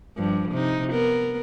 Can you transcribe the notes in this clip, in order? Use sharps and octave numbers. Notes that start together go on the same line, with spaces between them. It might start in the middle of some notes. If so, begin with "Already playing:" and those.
G2 F3 G3
C3 D#4
B3 A#4